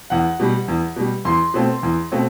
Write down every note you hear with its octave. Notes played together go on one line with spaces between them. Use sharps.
E2 F#5
B2 G3
E2
B2 G3
E2 C6
B2 A3 C4
E2
B2 A3 C4